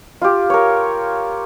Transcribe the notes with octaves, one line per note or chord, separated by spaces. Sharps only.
F4 G4
A#4 C#5